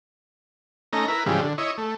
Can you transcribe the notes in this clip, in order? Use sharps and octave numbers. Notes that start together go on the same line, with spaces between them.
A3 C#4 D#4 A#5
E4 A#4 B4
G#2 C#3 E3 F3 G3
D3
E4 C#5 D#5
A3